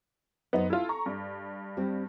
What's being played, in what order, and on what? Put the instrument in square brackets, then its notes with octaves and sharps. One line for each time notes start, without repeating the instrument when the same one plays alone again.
[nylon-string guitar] F#2 A4 C5 [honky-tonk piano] B3 D#4
[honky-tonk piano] E4 F4 [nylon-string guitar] A4
[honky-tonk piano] A#5 C#6
G2
[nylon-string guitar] G3 C4 G4